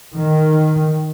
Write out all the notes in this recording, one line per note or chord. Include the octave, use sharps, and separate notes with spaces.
D#3